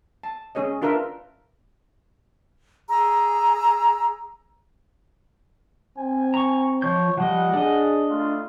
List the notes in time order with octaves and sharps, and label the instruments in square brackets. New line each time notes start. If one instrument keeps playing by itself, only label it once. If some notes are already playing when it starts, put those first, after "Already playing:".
[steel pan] A5
C#4 G#4 C#5 D#5
D4 F4 A#4 B4 E5
[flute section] G#4 A#5 E6
[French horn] C4 [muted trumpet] G#5
[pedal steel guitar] A#5 C#6
[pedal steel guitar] F3 G6 [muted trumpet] C#5
[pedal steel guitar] F3 G3 D#5 [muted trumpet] F#5
[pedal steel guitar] D4 D#5 [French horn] G#4
[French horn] A3 [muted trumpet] F4